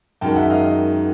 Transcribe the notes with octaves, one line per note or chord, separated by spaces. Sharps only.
F#2 D#3 G#3 G5 A5
E5 F#5
D#5 F5